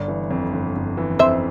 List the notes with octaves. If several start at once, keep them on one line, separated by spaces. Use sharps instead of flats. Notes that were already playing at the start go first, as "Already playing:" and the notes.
Already playing: G1 D5
E3
F2
G1
G1
E3
F2 C5 E5